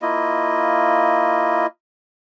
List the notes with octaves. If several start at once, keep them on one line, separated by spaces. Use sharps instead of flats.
A#3 E4 F4 D#5